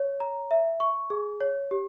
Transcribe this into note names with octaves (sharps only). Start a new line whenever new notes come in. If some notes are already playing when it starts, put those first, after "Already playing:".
Already playing: C#5
A#5
E5
C#6
G#4
C#5
G4